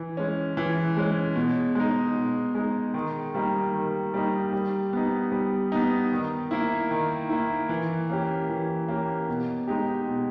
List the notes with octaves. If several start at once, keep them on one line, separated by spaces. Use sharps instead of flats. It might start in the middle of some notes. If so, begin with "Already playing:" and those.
Already playing: E3
G#3 C#4
E3
G#3 C#4
B2
G#3 D#4
B2
G#3 D#4
D#3
G3 A#3 D#4
D#3
G3 A#3 D#4
G3
B3 D#4
G3
B3 D#4
D#3
A#3 E4
D#3
A#3 E4
E3
A#3 C#4 G4
E3
A#3 C#4 G4
B2
G#3 D#4 G4
B2